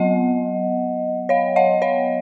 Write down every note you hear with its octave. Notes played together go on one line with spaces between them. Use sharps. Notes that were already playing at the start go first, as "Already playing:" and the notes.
Already playing: F#3 B3 D#5 F#5
C#5 F5
D#5 F#5
C#5 F5